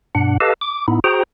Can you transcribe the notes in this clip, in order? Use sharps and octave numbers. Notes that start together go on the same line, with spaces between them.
G2 B2 D4 F#5
G4 A4 B4 D#5 F5 A5
D6
A2 B3 D#4 E4
F#4 G#4 C5 G5 A#5